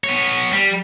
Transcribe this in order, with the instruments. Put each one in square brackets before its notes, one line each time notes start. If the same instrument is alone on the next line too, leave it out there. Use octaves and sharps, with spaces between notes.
[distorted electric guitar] B3 C#5
G3